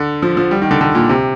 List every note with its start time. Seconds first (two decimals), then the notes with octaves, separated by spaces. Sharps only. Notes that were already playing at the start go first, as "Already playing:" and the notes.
Already playing: D3
0.22 F3
0.37 F3
0.51 G3
0.62 D#3
0.71 D3
0.81 D3
0.95 A#2
1.09 C3